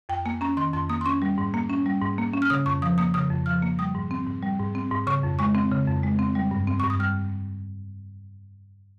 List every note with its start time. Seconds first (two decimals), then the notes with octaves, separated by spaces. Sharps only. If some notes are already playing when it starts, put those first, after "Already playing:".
0.09 F2 G5
0.25 A#3 G#5
0.41 C#4 A#5
0.57 D#3 C6
0.73 F2 C6
0.90 A#3 D#6
1.01 C6
1.06 C#4 C#6
1.22 G3
1.38 G#2
1.54 A#3
1.70 C#4
1.86 G3
2.02 G#2
2.18 A#3
2.33 C#4
2.42 F6
2.50 C#3 D#6
2.66 F2 C#6
2.82 F3 D#6
2.98 A#3 D#6
3.14 C#3 D#6
3.31 F2
3.46 F3 F6
3.62 A#3
3.79 G3 D#6
3.95 G#2
4.11 C4
4.26 G#2
4.42 G3
4.59 G#2
4.75 C4
4.91 G#2
5.07 C#3 C#6
5.23 F2
5.39 G#3 C#6
5.55 C4
5.72 C#3
5.87 F2
6.03 G#3
6.19 C4
6.35 G3
6.51 G2
6.68 C4
6.80 G2 C#6
6.90 D#6
7.00 G3 F6